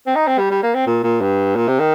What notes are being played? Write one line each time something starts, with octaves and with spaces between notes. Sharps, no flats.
C4
D#4
C4
G3
G3
A#3
C4
A#2
A#2
G2
A#2
C3
D#3